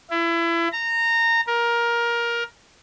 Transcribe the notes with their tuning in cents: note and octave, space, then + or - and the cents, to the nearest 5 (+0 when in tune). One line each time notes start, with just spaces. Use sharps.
E4 +30
A#5 -20
A#4 +15